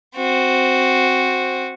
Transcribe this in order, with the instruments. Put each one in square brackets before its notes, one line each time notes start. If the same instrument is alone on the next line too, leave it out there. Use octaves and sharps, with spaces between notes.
[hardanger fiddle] C4 F#4